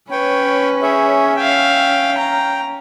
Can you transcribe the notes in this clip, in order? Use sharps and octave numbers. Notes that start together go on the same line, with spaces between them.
C#4 B4 C#5 G5
G#4 C#5 E5
E5 F5 G5
A#5